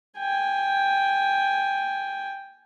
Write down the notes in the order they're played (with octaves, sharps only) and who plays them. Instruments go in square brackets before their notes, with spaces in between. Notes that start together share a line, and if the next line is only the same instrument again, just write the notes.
[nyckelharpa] G5 G#5